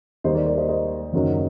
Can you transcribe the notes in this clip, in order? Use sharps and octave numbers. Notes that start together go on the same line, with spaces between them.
D#2 D#3 G3 A#3 C5 D#5
A#4 D5
A#4 D5
C5 D#5
C5 D#5
F#1 F#2 D#3 F#3